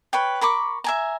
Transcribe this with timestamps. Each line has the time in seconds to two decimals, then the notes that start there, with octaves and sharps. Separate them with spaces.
0.13 B4 C#5 G5
0.41 A#4 B5 C#6 D6
0.84 E5 G#5 A#5